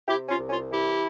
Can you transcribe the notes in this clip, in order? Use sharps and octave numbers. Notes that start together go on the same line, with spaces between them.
C3 E4 G4
C#4 F4
C2
C#4 F4
E3 E4 G4